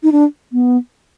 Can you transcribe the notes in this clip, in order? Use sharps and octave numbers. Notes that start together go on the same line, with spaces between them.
D#4
D4
B3